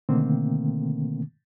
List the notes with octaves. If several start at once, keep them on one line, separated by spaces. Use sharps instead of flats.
B2 D3 D#3 A3 A#3 C4